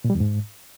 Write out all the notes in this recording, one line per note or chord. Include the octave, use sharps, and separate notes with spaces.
A#2
G3
E2
G#2